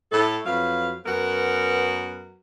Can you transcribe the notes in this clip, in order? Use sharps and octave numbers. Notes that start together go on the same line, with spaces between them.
A2 A4
F2 F#3 B4 F5
F#2 B3 F#4 A#4 B4